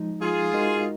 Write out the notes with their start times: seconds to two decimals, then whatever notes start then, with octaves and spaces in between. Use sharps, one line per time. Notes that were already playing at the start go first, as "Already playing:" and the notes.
Already playing: F3 G#3 D#4
0.22 F4 G#4
0.53 G#3 D#4 F#4 A#4 D#5